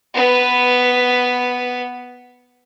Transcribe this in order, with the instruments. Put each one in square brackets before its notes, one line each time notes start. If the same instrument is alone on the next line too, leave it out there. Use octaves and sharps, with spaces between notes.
[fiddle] B3 B4